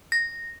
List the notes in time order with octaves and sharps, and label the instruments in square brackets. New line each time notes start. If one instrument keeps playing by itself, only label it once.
[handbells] A#6